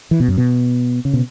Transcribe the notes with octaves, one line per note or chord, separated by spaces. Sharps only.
E3
B2
F#2
B2
C#3
B2